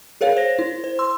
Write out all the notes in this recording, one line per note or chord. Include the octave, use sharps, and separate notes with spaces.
G#4 A#4 C#5 F5
C5 A#6
E4
C5
C6 E6